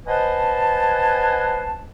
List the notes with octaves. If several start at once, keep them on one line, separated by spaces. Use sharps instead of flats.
B4 C5 D#5 F#5 G#5 A5